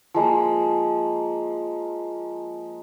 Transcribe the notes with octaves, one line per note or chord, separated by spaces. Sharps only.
F3 G#3 A#3